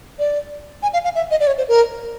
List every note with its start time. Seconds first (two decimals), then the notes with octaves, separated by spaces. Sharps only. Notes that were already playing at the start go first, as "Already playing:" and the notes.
0.19 D5
0.83 G#5
0.93 F5
1.04 F5
1.15 E5
1.31 D#5
1.40 D5
1.47 C#5
1.58 C5
1.68 A#4